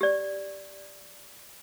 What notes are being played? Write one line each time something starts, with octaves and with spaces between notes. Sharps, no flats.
G4 D5